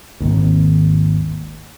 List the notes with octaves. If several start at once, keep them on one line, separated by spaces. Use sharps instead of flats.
G#1 D#2